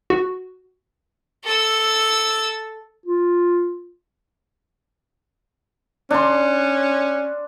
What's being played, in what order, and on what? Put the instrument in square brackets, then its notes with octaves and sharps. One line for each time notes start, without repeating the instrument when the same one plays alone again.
[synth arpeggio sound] F#4
[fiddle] A4 E6
[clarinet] F4
[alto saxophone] C#4 [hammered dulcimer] D4 C6